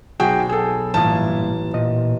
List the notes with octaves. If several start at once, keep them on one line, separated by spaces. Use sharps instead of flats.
B1 F#4 G#4 G5
G#4 A4
A1 G2 A#2 E4 F4 A5 D#6
A#2 D#5